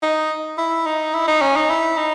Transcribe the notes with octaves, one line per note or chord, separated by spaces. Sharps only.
D#4
E4
D#4
E4
D#4
C#4
D#4
E4
D#4